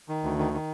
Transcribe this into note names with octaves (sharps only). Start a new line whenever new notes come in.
D#3
D2
D#3
D#3